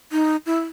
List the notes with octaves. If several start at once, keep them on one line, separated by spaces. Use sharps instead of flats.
D#4
E4